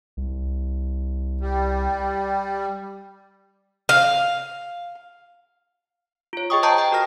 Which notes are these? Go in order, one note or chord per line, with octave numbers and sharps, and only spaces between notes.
C2
G3
F5
F4 C#5
G#4 D#5 G5 C#6 D#6
C5 D#5 G5 A5 A#5 G6
G5 A#5
F#4 A#4 F6 A#6